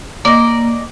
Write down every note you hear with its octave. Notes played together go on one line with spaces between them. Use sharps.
A#3 D5 D#5